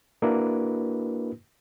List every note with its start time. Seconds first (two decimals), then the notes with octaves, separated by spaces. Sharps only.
0.22 A#3 D4 E4 F#4 A#4 B4